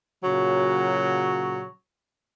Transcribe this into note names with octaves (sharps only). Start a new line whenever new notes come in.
A#2 C#3 F#3